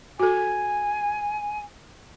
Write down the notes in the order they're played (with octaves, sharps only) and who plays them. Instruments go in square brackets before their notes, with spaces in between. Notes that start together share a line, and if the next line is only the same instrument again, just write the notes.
[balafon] F#4 A4 [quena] G#5